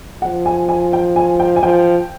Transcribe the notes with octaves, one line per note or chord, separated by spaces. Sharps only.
F3 F#5
G#5
G#5
G5
G#5
G5
G#5
F3 G5